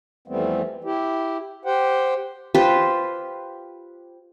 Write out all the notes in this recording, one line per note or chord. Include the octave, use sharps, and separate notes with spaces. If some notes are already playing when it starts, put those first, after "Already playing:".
F2 E3 G3 A3 B3 C4
E4 G4
G4 C5 F#5 G5
F4 G4 B4 C5